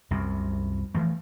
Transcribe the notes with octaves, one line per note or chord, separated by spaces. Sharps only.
C2 F#2 C3
E3 F3 A3